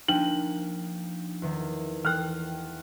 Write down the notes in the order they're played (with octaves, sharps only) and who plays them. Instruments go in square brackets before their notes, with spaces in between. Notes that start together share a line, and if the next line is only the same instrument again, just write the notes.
[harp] F3 A#3 [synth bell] D4 D#4 [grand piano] G5 F#7
[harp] E2 D#3
[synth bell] E3 G5 [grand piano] F6 F#6